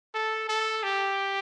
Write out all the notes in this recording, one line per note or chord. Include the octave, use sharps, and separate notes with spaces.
A4
A4
G4